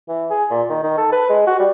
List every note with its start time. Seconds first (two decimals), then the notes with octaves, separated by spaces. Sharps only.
0.08 E3
0.30 G#4
0.50 A#2
0.69 D#3
0.83 D#3
0.98 A4
1.12 B4
1.29 G#3
1.47 F#4
1.59 G3